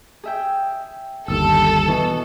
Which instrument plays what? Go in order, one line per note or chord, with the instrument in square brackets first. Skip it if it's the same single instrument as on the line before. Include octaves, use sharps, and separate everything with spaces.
[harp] G#4 E5 G5
[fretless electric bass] G1 D#2 [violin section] A4 [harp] E6
[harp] B2 B3 [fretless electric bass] E3